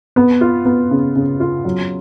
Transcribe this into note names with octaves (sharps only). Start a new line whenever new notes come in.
B3
F4
B3
C#3
C#3
F4
F#3